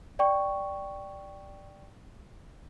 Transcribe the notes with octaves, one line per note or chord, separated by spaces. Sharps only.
D5 G5 C#6